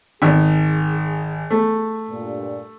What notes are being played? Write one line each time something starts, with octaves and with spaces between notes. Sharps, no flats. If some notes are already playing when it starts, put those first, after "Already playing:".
G#1 G#4
A3
G2 A#2